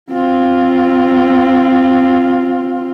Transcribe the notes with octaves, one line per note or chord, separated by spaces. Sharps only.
C4 F4